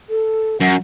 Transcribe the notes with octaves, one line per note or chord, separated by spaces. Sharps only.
A4
F#2 F#5